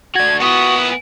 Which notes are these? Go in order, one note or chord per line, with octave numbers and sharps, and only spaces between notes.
D4 F#4 G#6
A#2 B3 E4 F#4 D#6